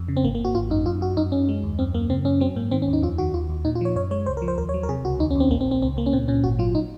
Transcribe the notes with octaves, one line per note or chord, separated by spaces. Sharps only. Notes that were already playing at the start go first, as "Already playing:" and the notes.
Already playing: F2
C#3
C4
G#1 A#3
A#3
G#1
F#4
G#1 F4
F#2 D#4
F#2 F4
F#2 F#4
F#2 D#4
F#2 C#4
G#3
D#2
F#2 C4
F#2 A#3
C#3 C4
F#2 C#4
F#3 C4
G#2 A#3
D#3 C4
C#4
D#2
D#4
F2 F4
D#3 F#4
D#2 F4
D#2
A#2 D#4
F4
F3 C#5
F#2 C#5
G#3 C#5
C#2 C5
A#4
F3
C5
D#2 A#4
C#5
F#3
A#4
C3 G#4
C#2 F#4
D#2 D#4
C#4
D#2 C4
A#1 A#3
C4
A#1
C4
C#2 C4
C#2 A#3
C#4
A#2 C4
A#2 C#4
G#1 F#4
F#3 F4
D#4